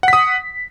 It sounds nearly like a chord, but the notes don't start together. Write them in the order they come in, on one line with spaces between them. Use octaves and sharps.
F#5 B6 D#6